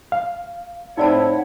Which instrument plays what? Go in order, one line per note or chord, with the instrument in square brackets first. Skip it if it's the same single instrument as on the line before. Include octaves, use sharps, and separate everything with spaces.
[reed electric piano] F5
[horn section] A2 C4 E4 [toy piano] D#4 D5 A5 [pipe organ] C#5 F#5